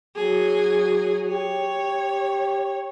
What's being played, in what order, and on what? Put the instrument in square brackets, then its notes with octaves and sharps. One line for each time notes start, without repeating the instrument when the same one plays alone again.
[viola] F#3 G#4
[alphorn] G4 [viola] C#5